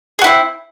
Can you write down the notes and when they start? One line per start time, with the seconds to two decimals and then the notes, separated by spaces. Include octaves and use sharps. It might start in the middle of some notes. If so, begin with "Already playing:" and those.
0.19 G#4
0.21 F#4
0.24 E4
0.27 C4